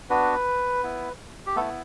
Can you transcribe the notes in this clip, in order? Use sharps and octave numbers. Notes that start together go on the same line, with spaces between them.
B3 D4 F#4 B4
B3 E4
G4
A3 B3 E4 A4